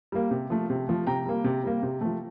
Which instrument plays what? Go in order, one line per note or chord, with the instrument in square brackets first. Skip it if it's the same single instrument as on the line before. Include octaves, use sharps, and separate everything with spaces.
[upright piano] G3 A#3
C3
F3 A3
C3
F3 A3
C3 G5 A#5
G3 A#3
C3
G3 A#3
C3
F3 A3